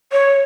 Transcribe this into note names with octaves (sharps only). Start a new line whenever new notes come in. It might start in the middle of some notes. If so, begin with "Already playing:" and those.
C#5